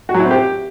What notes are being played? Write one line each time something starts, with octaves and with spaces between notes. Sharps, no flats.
F#4
F#3
E4
C4
G4